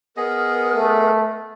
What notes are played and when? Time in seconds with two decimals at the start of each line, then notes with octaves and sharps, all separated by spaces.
0.17 B3 G#4 A#4 D#5
0.75 A3